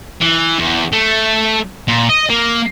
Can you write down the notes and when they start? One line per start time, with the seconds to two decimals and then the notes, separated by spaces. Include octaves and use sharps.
0.21 E3
0.59 E2
0.93 A3
1.88 A#2
2.09 D#5
2.29 A#3